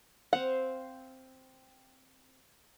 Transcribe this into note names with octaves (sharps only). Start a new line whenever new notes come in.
C4 C5 F5 F#5